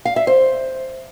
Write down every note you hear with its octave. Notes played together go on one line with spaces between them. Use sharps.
F5
E5
C5